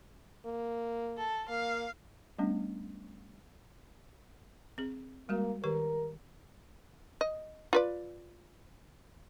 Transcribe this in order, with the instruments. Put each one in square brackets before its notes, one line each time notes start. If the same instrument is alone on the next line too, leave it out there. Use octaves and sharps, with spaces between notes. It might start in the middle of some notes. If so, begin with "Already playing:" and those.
[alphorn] A#3
[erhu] A4
[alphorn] A#3 [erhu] F5
[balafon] G3 A3 B3 C#4 D4
C4 G#4
[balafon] G3 G#3 F#4 [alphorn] A#3
[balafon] D#3 G4 B4 [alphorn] A#4
[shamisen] D#5
F4 B4 D5